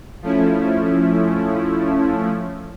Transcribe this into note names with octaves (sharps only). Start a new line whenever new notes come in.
F3 A3 C#4 E4